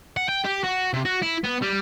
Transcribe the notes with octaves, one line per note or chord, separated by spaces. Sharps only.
F#5
G5
G4
F#4
C3
F#4
E4
B3
G3